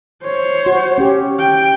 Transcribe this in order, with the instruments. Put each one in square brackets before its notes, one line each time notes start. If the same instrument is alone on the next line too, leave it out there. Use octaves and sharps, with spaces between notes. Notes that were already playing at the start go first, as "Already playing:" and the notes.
[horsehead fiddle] C5 C#5
[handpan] F#4
C#4 G4
[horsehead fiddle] G5